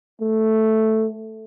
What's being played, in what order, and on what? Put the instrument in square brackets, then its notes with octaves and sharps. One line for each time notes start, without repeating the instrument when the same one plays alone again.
[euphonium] A3